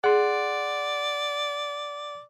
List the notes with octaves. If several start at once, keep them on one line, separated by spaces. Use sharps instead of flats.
G#4 D5 F#5 C6